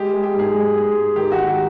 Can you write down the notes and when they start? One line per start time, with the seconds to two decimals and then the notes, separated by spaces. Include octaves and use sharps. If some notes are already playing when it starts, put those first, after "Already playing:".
Already playing: G#3 G4
0.14 G#3
0.23 G4
0.34 G#2
0.39 G#4
0.54 G#2
0.75 G#3
0.95 G#2
1.16 D#3 G4
1.32 F#4
1.37 D#3
1.47 G4